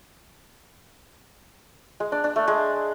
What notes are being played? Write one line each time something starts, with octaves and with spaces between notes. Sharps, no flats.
G#3
D4
D4
A3
G#3